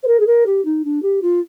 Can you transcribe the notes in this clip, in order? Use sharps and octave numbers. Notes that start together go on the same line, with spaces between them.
C5
A#4
G#4
A#4
G4
D#4
D4
G4
F4